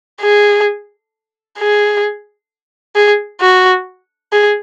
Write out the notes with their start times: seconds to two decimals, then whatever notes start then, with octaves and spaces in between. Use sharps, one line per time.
0.21 G#4
1.59 G#4
2.96 G#4
3.41 F#4
4.32 G#4